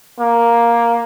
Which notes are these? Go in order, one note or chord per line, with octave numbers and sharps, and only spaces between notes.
A#3